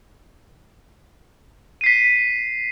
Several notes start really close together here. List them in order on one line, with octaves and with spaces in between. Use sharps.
D#7 C7 B6